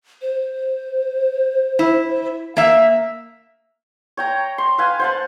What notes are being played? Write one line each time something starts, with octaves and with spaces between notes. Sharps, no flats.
C5
E4
A#3 E5
C#5 G5 A#5
C6
B4 F5 G#5
C5 F#5 A5